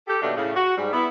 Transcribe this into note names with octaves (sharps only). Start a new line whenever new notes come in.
G4 A4
D#2 B2 D#3 F#3 A3 D4
A2 C#3
F#4
G#2 G3
B3 E4